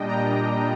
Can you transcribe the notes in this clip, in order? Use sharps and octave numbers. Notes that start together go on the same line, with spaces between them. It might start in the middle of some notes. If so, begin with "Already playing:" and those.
Already playing: A#2 G3 D4 D#5 G5
A#5